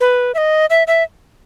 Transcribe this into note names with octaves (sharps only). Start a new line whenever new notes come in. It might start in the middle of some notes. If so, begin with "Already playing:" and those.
B4
E5
D#5
E5
E5